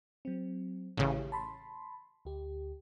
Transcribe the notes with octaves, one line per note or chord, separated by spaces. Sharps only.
F#3 C4
A1 C#3 E4 G4 C#5
A5 B5 C6
D2 G4